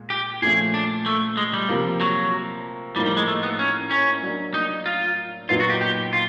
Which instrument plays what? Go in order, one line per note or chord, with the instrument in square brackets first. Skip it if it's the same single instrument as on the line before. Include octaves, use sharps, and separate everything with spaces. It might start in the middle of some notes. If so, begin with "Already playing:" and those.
Already playing: [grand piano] A#2 G#3
[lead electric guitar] G4
[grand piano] A#2 F3 A3 C#4 [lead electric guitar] G#4
[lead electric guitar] D4
A3
G#3
G3
[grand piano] C3 F3 A#3
[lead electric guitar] F#3
[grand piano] A2 F3 A#3 D#4 [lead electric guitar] G3
[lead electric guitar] G3
G#3
A3
B3
C#4
C#4
[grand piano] F#3 A#3 D4
[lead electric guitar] D#4
F4
[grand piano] A#2 F#3 B3 D#4 [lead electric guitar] F4
[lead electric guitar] F#4
G4
G4
F4